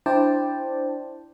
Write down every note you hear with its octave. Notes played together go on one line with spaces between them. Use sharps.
D4 E4 C5 D5 G5 A5